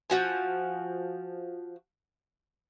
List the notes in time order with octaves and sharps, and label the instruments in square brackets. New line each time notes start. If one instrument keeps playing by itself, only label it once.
[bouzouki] F3 F#4 G#5